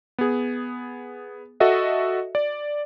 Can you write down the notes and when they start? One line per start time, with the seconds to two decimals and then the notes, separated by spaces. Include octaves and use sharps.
0.18 B3 G#4
1.60 F#4 A4 D#5 E5 F#5
2.35 D5